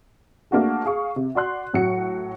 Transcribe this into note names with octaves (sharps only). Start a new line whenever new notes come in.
A3 A#3 D4 F#4 G#4
G#4 F5 C#6
C3
F#4 D5 C6 F#6
A2 F#3 F#4 C#7